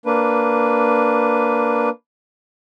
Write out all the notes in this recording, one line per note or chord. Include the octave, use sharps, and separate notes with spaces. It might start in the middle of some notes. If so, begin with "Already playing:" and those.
A#3 D4 B4